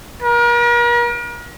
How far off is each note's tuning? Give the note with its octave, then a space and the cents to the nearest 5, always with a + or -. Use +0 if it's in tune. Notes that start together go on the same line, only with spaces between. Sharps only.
A#4 +40